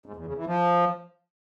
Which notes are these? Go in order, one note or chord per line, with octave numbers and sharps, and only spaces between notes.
G#2
E2
C#3
E3
F3